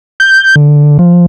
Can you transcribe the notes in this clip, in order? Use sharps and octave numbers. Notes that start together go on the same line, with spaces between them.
G6
D3
F3